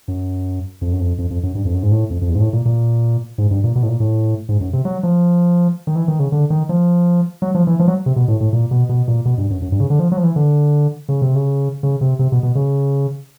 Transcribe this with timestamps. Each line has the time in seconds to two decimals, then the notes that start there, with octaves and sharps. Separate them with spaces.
0.08 F#2
0.81 F2
0.93 F#2
1.00 F2
1.18 F2
1.30 F2
1.43 F#2
1.55 G2
1.65 F2
1.74 F#2
1.83 G#2
1.91 A2
2.10 F2
2.21 F2
2.29 E2
2.35 G#2
2.40 A2
2.53 A#2
2.65 A#2
3.38 G#2
3.51 G2
3.64 A#2
3.75 B2
3.83 A2
3.88 A#2
4.00 A2
4.49 G#2
4.60 F#2
4.73 C3
4.85 F#3
5.03 F3
5.87 D#3
5.96 E3
6.08 D#3
6.19 C#3
6.32 D3
6.50 D#3
6.69 F3
7.42 F#3
7.55 F3
7.67 E3
7.79 F3
7.88 F#3
8.06 C3
8.16 B2
8.28 A2
8.40 A2
8.53 A#2
8.71 B2
8.89 B2
9.08 A#2
9.25 B2
9.38 G2
9.50 F#2
9.62 F#2
9.72 G2
9.80 C#3
9.90 D3
9.99 F3
10.12 F#3
10.17 F3
10.24 E3
10.36 D3
11.09 C#3
11.22 C3
11.35 C#3
11.83 C#3
12.01 C3
12.19 C3
12.32 B2
12.43 B2
12.55 C#3